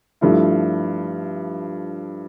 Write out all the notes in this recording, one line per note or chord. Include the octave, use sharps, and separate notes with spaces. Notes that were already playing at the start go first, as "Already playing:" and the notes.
G2 F3 A3 E4